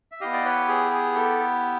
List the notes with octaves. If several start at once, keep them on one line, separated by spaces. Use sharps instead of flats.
E5
B3 E4 G4 D#5 F5
D5
B4 C#5
G#4
G#4
A4